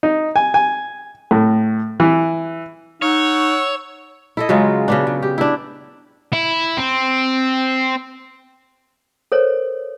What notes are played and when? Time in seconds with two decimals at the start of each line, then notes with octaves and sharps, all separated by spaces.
0.03 D#4
0.36 G#5
0.54 G#5
1.31 A2
2.00 E3
3.02 D#4 C#5 F#5 E6
4.37 E4 A4 D#5
4.49 C#3 F#3 G#3 F4
4.88 C#3 B3 D4
5.07 C#3
5.22 G4
5.38 D4 E4
6.33 E4
6.77 C4
9.32 A4 A#4 C5 C#5